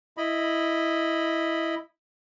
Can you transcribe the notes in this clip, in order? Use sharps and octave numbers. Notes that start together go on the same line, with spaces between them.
E4 D#5 B5